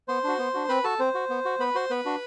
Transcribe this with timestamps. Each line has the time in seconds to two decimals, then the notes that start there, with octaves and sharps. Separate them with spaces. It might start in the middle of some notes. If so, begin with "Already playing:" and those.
0.08 B3 C5 C6
0.24 D4 F#4
0.39 B3
0.54 D4 F#4
0.69 C4 B4 B5
0.84 F#4 A4 A5
0.99 C4 C5
1.15 F#4
1.30 B3
1.45 F#4
1.60 B3 B4 B5
1.75 F#4 C5 C6
1.90 B3 B4 B5
2.06 D4 F#4